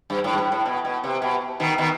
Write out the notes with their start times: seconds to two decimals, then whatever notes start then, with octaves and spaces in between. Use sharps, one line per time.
0.10 G2
0.24 A2
0.33 G2
0.38 A2
0.52 A2
0.66 B2
0.85 B2
1.04 C3
1.22 B2
1.60 B2 D#3
1.78 B2 D#3